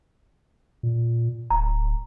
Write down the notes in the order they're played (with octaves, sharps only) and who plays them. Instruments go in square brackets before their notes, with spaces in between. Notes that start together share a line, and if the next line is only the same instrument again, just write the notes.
[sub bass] A#2
[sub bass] D1 [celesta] A#5